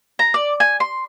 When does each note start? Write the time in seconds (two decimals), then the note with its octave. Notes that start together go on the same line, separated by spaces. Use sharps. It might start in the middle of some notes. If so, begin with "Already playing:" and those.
0.19 A#5
0.34 D5
0.60 G#5
0.80 C6